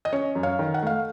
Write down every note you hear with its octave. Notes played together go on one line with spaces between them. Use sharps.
D#5
C#4 C#5
F#2
C#5 F5
D#3
F#5
A3 F5